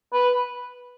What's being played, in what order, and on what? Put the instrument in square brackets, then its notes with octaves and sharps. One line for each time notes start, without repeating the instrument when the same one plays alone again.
[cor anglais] B4